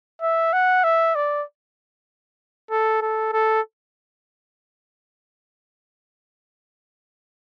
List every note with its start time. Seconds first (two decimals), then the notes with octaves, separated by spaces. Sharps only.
0.22 E5
0.53 F#5
0.84 E5
1.15 D5
2.71 A4
3.02 A4
3.33 A4